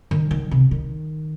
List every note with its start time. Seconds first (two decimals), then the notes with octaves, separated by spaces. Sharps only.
0.11 D#3
0.31 D#3
0.51 C3
0.71 D#3